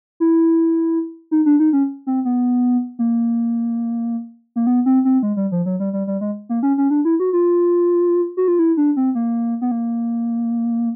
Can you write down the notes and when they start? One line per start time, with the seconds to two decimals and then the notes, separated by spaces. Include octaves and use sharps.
0.20 E4
1.31 D#4
1.46 D4
1.60 D#4
1.73 C#4
2.07 C4
2.25 B3
2.99 A#3
4.56 A#3
4.67 B3
4.86 C4
5.05 C4
5.23 G#3
5.37 G3
5.52 F3
5.66 F#3
5.80 G3
5.93 G3
6.07 G3
6.21 G#3
6.49 A#3
6.63 C#4
6.78 C#4
6.90 D4
7.05 E4
7.20 F#4
7.33 F4
8.37 F#4
8.48 F4
8.59 E4
8.77 D4
8.97 C4
9.15 A#3
9.62 B3
9.71 A#3